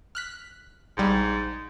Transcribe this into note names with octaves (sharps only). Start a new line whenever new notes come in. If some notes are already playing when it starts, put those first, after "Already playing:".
F6 F#6 B6
A#1 G#2 G3